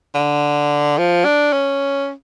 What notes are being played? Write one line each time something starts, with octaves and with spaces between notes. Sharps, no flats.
D3
F3
D4
C#4